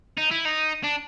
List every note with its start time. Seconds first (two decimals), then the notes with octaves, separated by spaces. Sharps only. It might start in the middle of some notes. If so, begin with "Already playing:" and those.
0.18 D#4
0.31 E4
0.45 D#4
0.84 D4